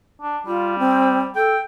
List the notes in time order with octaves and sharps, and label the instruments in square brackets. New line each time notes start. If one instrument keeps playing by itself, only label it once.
[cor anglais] D4
[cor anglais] G3 [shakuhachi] F4
[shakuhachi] C4
[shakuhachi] A4 [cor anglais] G5